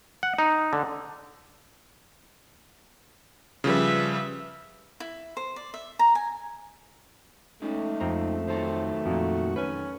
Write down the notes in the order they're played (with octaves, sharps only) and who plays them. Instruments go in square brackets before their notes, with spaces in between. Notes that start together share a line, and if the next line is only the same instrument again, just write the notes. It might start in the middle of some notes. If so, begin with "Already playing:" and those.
[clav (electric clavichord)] F#5
D#4
D3
[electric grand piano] C#3 F3 G3 [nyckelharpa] B4 E5
[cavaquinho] E4
C5
D5
E5
A#5
G#5
[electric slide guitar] G#3 C#4 D#4 [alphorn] A3
[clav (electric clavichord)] F2 C4 A#5
[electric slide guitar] D#3 F#3 A4 [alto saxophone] C5
[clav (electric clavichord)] F2 A#2 [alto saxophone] F#4
[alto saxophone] C#4 [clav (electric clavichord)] B4 G#5